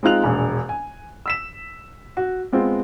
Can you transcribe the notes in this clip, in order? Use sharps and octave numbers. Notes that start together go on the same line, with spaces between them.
G#3 C4 D#4 F4 F#6 F7
E1 A#1
G#5
E6 B6 E7
F#4
G#3 B3 C4 F4